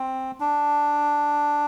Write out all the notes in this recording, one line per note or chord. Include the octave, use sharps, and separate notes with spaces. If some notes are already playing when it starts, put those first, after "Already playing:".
Already playing: C4
D4